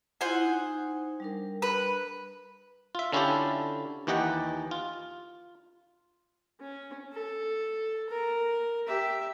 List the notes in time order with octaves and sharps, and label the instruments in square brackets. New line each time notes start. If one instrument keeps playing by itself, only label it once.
[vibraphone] E4 F4 [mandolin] C5 F#5 G#5
[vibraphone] D#4
G3 D4 A#4
[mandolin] B4
[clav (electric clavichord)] F4 E5
D3 C#4 E4 F4 G4 A4
D#2 E3 G4 D#5 F#5
F4
[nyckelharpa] C#4
A4
A#4
G4 E5